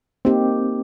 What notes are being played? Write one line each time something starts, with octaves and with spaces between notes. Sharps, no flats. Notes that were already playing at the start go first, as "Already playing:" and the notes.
A#3 C4 D#4 G4